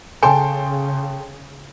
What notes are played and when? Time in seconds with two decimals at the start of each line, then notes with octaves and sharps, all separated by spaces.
0.23 C#3 A4 G5 G#5 C6